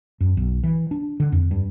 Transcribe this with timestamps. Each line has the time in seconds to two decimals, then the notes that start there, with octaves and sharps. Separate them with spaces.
0.20 F#2
0.37 B1
0.63 E3
0.91 D4
1.20 D3
1.32 F2
1.51 G2